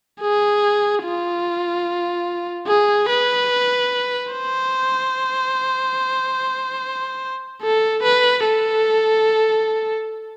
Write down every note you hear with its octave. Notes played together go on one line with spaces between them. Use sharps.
G#4
F4
G#4
B4
C5
A4
B4
A4